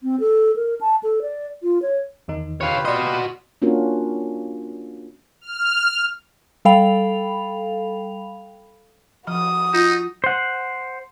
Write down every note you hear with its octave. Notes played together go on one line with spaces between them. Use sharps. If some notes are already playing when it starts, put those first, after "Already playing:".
C4
A4
A#4
A5
A4
D5
F4
C#5
E2 D#3 D#4
F4 G4 B4 C#5 F5
F#4 D5 D#5 C6
A#3 C#4 D4 F4 F#4 A#4
F6
G3 A4 F5 G5 B5 F7
F3 F#4 D#6
D#4 F4
C5 F#5